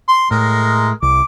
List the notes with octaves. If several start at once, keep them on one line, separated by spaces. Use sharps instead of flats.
C6
A2 G#3 A#4
C2 D6